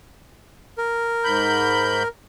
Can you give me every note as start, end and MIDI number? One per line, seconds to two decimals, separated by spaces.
0.78 2.08 70
1.24 2.03 44
1.24 2.03 83
1.24 2.03 91